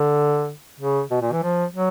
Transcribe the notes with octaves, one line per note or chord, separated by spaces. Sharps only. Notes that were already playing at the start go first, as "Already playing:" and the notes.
Already playing: D3
C#3
B2
A#2
E3
F3
F#3